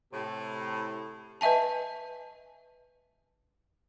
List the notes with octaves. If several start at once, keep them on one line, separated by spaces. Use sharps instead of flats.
A2 C3
B4 D#5 E5 G#5 A5